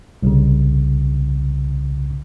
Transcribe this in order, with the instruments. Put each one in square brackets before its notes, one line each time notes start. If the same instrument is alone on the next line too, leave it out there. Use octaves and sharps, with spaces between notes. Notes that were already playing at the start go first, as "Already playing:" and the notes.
[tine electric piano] C2 C#3